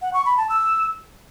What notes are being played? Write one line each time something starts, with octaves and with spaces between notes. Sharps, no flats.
F#5
C#6
B5
A5
E6